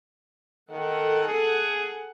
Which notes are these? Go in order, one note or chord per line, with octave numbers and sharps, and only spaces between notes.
D#3 A4 F#5
G#4